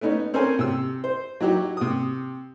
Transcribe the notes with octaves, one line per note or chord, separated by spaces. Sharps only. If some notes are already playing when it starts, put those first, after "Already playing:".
A3 B3 C#4 D#4
C4 C#4 A4 A#4 C5 G#5
C3 E6
C5
F#3 D#4 E4 F#4 G4
C3 D#6